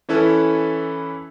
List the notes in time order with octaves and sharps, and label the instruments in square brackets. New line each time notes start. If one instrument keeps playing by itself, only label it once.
[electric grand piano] E3 C#4 E4 A4 B4 C#5